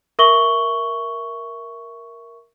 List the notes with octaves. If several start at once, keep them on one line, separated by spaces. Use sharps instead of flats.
A#4 E5 C#6 F#7 G7